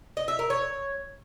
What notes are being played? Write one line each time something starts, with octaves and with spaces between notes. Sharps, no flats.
D#5
E5
A#4
C#5